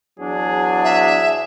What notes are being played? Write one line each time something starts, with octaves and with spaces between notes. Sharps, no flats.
E2 F#3 D4 G#4
E5